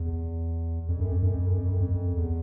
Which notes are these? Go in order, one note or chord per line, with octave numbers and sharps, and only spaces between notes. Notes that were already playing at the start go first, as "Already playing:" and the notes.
Already playing: E2
F2
F#2
F2
F#2
F2
F#2
F2
F#2
F2
E2